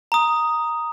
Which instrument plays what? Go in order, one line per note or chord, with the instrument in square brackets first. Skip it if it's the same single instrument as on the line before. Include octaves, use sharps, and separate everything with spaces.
[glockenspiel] A#5 D#6